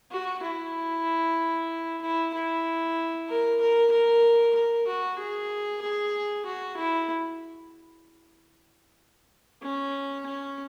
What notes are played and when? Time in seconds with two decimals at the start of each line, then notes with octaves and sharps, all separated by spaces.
0.11 F#4
0.43 E4
2.02 E4
2.34 E4
3.29 A#4
3.61 A#4
3.92 A#4
4.55 A#4
4.87 F#4
5.18 G#4
5.82 G#4
6.46 F#4
6.77 E4
9.62 C#4
10.26 C#4